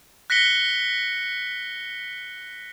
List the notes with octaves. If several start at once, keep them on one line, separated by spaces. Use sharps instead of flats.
F#6 A#6 B6 C#7 G7